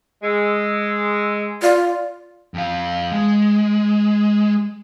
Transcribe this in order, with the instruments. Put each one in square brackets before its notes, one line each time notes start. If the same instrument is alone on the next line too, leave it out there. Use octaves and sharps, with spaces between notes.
[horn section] G#3 [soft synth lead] E6
[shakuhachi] F4 [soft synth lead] D5
[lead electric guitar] F2 F5
G#3